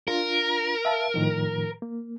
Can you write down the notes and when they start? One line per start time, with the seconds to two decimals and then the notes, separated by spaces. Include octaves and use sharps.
0.08 D4 F4 A#4
0.85 E5 F5 A5
1.14 A2 D#3 F3
1.82 A#3